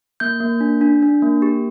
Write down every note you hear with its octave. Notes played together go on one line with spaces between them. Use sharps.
A#3 G6
A#3
D4
D4
D4
A#3
G4